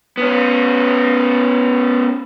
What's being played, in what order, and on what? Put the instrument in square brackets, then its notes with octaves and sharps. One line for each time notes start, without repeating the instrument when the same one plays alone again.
[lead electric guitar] B3 C#4